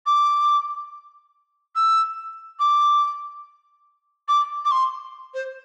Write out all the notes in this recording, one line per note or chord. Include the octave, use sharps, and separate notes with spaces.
D6
E6
D6
D6
D6
C6
C5